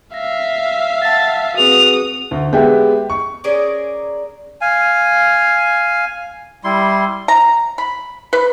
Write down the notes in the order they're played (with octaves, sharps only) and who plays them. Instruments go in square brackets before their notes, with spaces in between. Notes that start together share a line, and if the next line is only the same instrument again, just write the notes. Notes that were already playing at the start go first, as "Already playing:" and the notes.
[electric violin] E5 F5 [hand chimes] A#6
[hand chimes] F#5 A5 [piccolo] A6
[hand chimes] C4 G#4 B4 [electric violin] F#4 D#6 [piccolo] F7
[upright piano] D2
G#3 B3 G4 E5
C#6
[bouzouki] C#4 G#4 A#4 D5
[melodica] F5 G#5
G3 E4 C6
[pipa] A#5
B5
B4